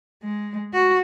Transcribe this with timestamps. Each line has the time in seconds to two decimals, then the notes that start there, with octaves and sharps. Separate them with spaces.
0.23 G#3
0.73 F#4